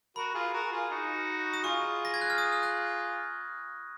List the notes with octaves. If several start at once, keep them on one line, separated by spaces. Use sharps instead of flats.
F#4 A#4 B5
F4 G#4
F#4 A#4
F4 G#4
D#4 F#4
D#6
F4 G#4 C#6
A#6
G#6
F#6
F6
D#6
F6
F#6